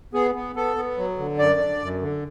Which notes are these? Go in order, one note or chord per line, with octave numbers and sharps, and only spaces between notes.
B3 G#4
B3
B3 A4
B3
F#3
D3
F#2 D5
D3
F#2
D3